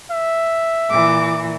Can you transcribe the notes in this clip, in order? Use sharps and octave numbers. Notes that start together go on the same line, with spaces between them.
E5
A#2 E3 D6